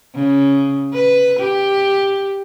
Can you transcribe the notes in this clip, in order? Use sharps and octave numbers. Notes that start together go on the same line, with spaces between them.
C#3
B4
G4